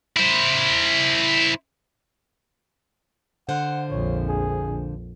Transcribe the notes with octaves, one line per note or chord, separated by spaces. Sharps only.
E4 C5
D3 C5 F5 F#5
A#1 F2 C#5
G#4